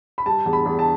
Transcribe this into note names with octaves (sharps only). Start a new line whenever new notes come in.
B5
G3 A5
E2
B5
E2
A5